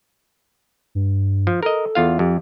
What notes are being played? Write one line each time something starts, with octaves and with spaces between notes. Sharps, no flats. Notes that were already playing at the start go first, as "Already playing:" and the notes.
G2
F3
A4 A#4 D#5
E2 F4 F5
F2 G4